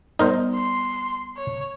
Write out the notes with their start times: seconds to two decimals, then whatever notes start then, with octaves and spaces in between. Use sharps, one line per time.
0.19 G3 B3 D#4 A#4 C5 D5
0.55 C6
1.36 C#5